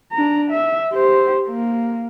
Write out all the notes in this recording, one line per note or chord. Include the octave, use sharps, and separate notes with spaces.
D4 A#5
E5
G4 C5
A#3